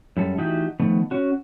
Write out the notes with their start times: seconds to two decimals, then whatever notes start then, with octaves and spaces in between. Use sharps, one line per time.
0.17 F#2 G3 A4
0.38 E3 A3 D#4 F#4 G4
0.80 D#3 F3 A3 B3
1.11 C#4 F#4